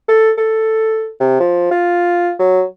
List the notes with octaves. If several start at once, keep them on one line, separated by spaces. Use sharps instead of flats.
A4
A4
C3
F3
F4
F#3